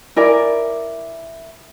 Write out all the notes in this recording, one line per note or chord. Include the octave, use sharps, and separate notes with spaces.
E4 A#4 D5 G#5